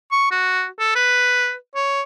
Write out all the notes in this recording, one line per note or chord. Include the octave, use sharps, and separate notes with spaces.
C#6
F#4
A4
B4
C#5